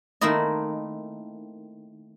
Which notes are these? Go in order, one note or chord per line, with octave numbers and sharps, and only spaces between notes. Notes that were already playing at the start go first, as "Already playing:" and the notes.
D#3 A3 A#3 C4 E4 D#5